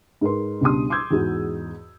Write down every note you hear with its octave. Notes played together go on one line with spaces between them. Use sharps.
G#2 A#4 B4 C6
C#2 B2 G3 D4 C6 D#6
C6 D6 E6 G6 G#6
E2 G#2 F#4